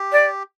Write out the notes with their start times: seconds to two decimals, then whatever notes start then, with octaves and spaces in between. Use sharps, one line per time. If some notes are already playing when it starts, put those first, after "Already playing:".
Already playing: G4
0.12 D5